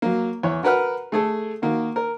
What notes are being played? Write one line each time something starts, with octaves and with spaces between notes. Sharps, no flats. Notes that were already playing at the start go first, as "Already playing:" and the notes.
F#3 A#3
E2 C#5
F#4 A#4 B4 F#5 F6
A3 G#4 A4
D#3 A#3 F#4
A#4